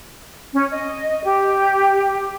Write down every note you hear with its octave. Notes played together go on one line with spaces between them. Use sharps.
C#4
D#5
G4